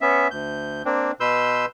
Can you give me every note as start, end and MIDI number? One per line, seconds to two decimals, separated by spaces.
0.01 0.28 59
0.01 0.28 61
0.01 0.28 76
0.31 0.82 38
0.31 0.82 91
0.85 1.12 58
0.85 1.12 60
0.85 1.12 62
1.20 1.66 47
1.20 1.66 71
1.20 1.66 84
1.20 1.66 88
1.20 1.66 91